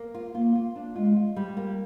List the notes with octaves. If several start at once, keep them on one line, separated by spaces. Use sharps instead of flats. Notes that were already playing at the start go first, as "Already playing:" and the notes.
Already playing: A#3
F4
A#3 F4
F4
D4
G#3 F4
F4
G3
A#3